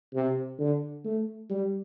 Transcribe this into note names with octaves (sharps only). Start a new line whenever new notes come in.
C3
D3
A3
G3